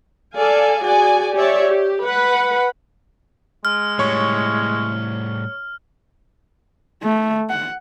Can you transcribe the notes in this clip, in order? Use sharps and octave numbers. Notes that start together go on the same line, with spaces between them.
A4 D5 F5 G#5
F#4 G#4 D5 G#5
G4 C#5 D5 E5
G4
B4 F#5 B5
G#3 F6
A2 G3 C#5 C#6
A3
F#5